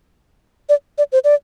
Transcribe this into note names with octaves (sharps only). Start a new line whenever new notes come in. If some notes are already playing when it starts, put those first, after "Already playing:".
D5
D5
C5
D5